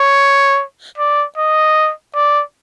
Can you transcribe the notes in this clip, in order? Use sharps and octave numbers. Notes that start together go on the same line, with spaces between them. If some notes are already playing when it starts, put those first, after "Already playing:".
Already playing: C#5
D5
D#5
D5